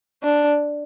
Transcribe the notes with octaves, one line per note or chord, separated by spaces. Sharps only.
D4